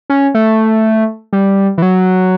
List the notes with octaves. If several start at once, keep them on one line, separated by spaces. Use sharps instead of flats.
C#4
A3
G3
E3
F#3